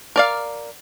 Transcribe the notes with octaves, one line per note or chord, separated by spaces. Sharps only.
A#4 D5 F5